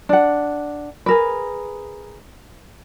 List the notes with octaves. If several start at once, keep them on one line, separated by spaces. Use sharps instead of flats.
D4 F#5
G#4 A#4 B4